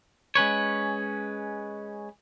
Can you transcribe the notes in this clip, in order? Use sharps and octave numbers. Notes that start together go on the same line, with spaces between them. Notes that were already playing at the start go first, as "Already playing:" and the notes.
G#3 C#4 B4 C#5